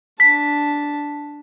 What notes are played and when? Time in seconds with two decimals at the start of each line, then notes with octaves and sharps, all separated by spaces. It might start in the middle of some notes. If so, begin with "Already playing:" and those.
0.20 D4 A5 B6